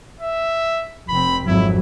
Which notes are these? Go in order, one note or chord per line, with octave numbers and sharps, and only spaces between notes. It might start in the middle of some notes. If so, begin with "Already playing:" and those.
E5
F1 C4 B5
G#1 F2 F#3 E4